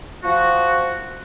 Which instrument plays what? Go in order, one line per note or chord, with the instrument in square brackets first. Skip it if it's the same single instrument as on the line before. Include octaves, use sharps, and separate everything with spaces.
[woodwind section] F3 F#4